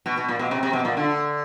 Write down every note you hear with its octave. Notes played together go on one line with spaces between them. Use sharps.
B2
B2
A#2
B2
C3
C3
B2
A#2
D3